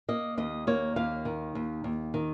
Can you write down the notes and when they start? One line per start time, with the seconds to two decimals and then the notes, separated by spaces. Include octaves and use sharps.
0.08 A#3 D#5
0.38 D#2 D#5
0.67 A#3 C#5
0.96 D#2 F5
1.25 D#3
1.55 D#2
1.84 D#2
2.14 D#3